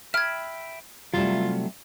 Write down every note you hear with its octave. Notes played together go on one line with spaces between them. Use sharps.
E5 G5 B5 F6 G#6
C3 F#3 G3 A3 E4 F4